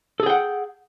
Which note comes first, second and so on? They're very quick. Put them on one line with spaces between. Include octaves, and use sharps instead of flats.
A4 G#4 G5 F#5